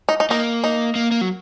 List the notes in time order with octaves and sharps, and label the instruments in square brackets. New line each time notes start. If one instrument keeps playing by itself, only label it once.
[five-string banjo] D#4
D#4
[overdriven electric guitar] A#3 [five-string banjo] D#4
[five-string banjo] D#4
[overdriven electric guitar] A#3
A#3
F#3